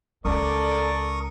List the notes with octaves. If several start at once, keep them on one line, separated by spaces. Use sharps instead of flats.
C#2 C#4 A4 A#4 D5 C#6 D#6